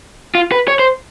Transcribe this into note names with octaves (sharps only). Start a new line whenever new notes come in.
F4
B4
C#5
C5